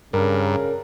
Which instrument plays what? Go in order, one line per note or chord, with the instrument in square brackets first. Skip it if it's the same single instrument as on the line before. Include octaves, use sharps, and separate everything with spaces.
[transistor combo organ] G2 [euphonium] C#3 [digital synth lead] A#4